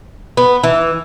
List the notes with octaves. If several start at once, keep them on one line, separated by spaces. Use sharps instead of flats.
B3
E3